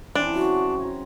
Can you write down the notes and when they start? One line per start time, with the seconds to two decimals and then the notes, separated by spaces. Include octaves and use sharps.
0.15 C#3 E3 C4 D4
0.34 F#3 F#4
0.80 G#5 A#5